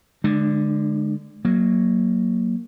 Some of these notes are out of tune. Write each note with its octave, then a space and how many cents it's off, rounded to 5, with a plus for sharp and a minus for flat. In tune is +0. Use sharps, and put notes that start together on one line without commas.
D3 +0 G#3 +15 D4 +45
F#3 +0 A#3 +0